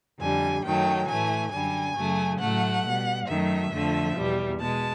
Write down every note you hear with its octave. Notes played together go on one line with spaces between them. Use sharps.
F2 D3 G3 G#5
F#2 D#3 F#3 A3 G5
A2 E3 A3 G#5
F#2 D3 G3 G#5
F#2 C#3 F#3 A3
A2 F#3 A3 F#5
B2 G3
F#2 D#3 F#3 A3 E5
F2 D3 F3 A3
E2 B2 G3
B2 G#3 A5